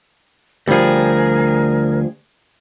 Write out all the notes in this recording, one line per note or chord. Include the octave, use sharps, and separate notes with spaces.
D2 F3 G3 G#4 A#4